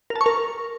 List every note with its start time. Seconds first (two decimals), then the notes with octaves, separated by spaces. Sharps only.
0.10 A#4
0.16 A5
0.21 C#6
0.26 A#4